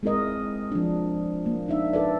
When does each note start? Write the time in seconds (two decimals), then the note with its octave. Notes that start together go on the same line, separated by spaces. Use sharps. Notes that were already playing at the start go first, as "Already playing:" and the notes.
0.03 G#3 C4 E4 A#4 D#5
0.72 F3 D4
1.46 A#3
1.68 D4 D#4 E5
1.93 A4 B4 D5